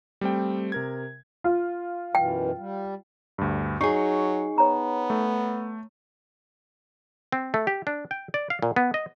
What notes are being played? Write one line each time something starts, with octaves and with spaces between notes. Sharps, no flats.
G3 A3 C4 G5
C3 A#4 G#6
F4
F#2 B2 E3 G5
G3
D2 G2
F#3 D#4 G#4 C#6 C7
B3 C#5 A#5
A3
C4
A3
G4
D4
G5
D5
F5
A#2
B3
D#5